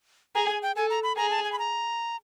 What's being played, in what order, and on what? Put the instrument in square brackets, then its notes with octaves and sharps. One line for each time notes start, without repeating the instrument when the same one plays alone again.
[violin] G#4 [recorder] A#5
[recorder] G#5
G5
[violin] A4 [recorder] G#5
[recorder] A#5
B5
[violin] G#4 [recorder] A#5
[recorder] A5
G#5
B5
A#5